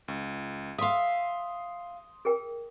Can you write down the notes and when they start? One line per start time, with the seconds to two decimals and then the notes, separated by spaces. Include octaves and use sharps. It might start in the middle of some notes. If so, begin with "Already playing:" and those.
0.08 C#2
0.78 E5 F5 C6 D#6
2.25 G#4 A#4 G5